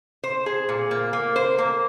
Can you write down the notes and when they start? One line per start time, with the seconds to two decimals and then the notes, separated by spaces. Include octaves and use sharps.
0.24 C5
0.46 G#4
0.69 A#2
0.91 A#3
1.13 A#3
1.36 C5
1.58 A#3